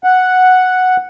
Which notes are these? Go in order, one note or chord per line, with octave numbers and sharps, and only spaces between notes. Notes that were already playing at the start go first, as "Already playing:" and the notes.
F#5